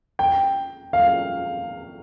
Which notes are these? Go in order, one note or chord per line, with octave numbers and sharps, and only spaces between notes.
G5
F5